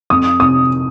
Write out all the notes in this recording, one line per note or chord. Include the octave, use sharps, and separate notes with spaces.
F2 D#6
C3 D#6